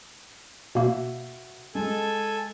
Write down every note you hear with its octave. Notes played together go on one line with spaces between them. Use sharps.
B2 A#3 F#4 E5
G#3 A4 G#5